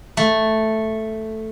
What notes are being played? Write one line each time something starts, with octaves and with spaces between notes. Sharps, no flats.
A3